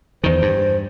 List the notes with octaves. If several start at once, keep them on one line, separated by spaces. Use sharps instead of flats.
E2 D#3 C5
G2